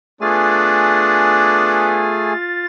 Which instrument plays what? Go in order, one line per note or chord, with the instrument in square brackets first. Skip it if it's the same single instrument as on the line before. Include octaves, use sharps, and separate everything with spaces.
[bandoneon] A3 G#4 G#5 [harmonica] B3 D4 [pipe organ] F4 A6